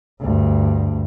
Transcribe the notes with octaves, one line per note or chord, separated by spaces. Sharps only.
D2 G2